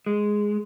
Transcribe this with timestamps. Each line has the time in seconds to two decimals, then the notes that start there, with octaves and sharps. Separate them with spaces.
0.06 G#3